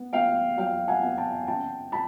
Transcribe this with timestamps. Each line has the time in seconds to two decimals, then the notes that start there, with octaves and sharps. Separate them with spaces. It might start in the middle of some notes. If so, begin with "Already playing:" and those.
Already playing: B3
0.13 B3 F5 G5
0.58 F#3 F5 G5
0.88 F#5 G#5
1.03 B3
1.18 G5 A5
1.47 C#3 G5 A5
1.92 A5 B5